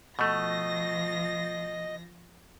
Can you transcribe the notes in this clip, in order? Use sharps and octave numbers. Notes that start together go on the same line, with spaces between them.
B2 F3 A3 D#5 A#6